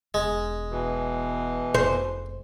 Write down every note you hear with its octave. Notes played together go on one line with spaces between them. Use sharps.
E1 G#3
B2 E3
F1 C5